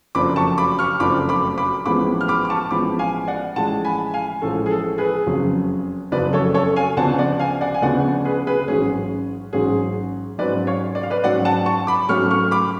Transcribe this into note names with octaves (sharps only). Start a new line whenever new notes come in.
F#1 F2 F3 A3 D4 B5 D6
A5 C#6
B5 D6
C#6 F6
F#1 F2 F3 A3 D4 B5 D6
B5 D6
B5 D6
A1 A2 F3 G#3 B3 B5 D6
F6
B5 D6
D6
A5 C#6
A1 A2 F3 G#3 B3 B5 D6
F5 G#5
D5 F#5
A1 A2 F3 G#3 F#5 A5
G#5 B5
F5 G#5
A1 A2 F3 G#3 A4
G#4
A4
G#4 B4
F#1 F2 C#3 F#3
F#1 F2 C#3 F#3 B4 D5
A4 C#5
A4 C#5
F5 G#5
D2 C#3 F3 B3 D4 F#5 A5
D5 F#5
F5 G#5
D5 F#5
G#5
D2 C#3 F3 B3 D4 D5 F#5
G#4 B4
G#4 B4
A1 G#2 F#3 C#4 G#4
A1 G#2 F#3 C#4 G#4
G#2 F#3 C#4 B4 D5
C#5 F5
D5
F5
B4 D5
G#2 F#3 C#4 D5 F#5
F#5 A5
A5 C#6
B5 D6
G#2 F#3 A3 C#4 C#6 F6
C#6 F6
B5 D6